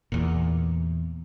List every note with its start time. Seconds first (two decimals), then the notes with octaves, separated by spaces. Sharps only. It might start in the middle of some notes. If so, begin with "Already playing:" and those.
0.12 E2 A#2